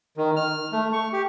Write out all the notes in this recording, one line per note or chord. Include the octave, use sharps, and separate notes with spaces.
D#3
F6
A3
C#6
G4